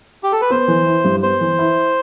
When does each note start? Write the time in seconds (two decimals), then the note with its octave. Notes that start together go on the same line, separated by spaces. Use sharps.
0.23 G4
0.32 A4
0.41 B4
0.50 B3 C5
0.68 E3
0.86 E4
1.04 G2
1.23 B3 C5
1.41 E3
1.59 E4